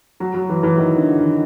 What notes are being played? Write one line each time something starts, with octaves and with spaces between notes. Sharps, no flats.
F#3
F#3
E3
E3
D#3
D3
D#3